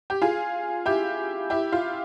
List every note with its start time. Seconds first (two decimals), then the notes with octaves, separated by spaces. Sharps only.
0.10 G4
0.22 F4 G#4
0.86 E4 G4
1.50 E4 G4
1.72 F4